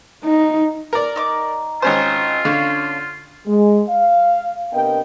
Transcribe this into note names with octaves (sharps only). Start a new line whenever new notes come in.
D#4
A#4 D5
D#4 D6
G#1 C#4 F4 C5
D3 C#4 D4 F5
G#3
F5
C3 B3 D4 A#4 D#5 G5